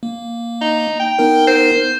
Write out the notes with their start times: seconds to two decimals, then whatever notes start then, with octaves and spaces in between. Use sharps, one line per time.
0.03 A#3
0.61 D#4
0.99 G5
1.19 B3 D#4 A#4
1.47 C5